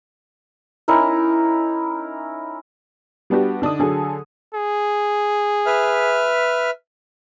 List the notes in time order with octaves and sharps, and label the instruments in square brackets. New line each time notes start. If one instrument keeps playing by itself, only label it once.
[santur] C#4 D#4 E4 A#4
[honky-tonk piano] G3 B3 D4 F#4 G4
D3 D4 D#4 D#6
D3 F#3 G#4 A4
[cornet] G#4
[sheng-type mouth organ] B4 E5 F6